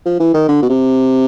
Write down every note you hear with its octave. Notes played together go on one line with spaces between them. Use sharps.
F3
E3
D#3
D3
B2
C3